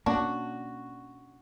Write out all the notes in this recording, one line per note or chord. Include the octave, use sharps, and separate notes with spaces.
B2 A#3 C#4 D4 F#4